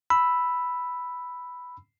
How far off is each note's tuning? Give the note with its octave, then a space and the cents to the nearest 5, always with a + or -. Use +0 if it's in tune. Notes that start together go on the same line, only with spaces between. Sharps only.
B5 +0 E6 +0